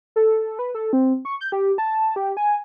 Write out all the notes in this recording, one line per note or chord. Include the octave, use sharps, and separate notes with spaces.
A4
B4
A4
C4
C#6
G6
G4
A5
G4
G#5